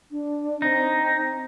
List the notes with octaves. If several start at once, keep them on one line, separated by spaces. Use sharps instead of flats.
D4
C4 D#4